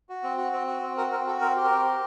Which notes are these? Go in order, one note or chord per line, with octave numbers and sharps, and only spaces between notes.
F#4
C4
F#4
C4
F#4
C4
F#4 A#4
C4 A#4
F#4 A4
C4 A#4
G4
A#4
C4
G4